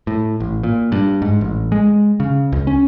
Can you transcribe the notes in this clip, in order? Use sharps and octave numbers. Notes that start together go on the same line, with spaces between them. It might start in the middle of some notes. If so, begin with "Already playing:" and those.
A2
A1
A#2
G2
G#2
A1
G#3
C#3
C#2
C#4